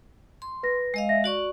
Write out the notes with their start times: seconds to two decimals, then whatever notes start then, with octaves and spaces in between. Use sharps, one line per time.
0.42 C6
0.63 B4 A#6
0.94 G#3 D#5 F5
1.09 E5 A#6
1.24 F#4 D5 C#6 F#7